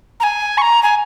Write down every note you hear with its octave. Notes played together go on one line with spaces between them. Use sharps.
A#5
G#5
C#6
A#5
G#5